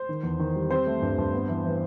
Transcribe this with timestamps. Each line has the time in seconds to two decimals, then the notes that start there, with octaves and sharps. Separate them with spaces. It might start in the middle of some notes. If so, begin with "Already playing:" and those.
Already playing: C5
0.09 D#3
0.23 E2
0.39 D#3
0.56 G3
0.70 C4 C5
0.86 A3
1.02 G2
1.18 G2
1.33 B3
1.49 E3
1.65 E3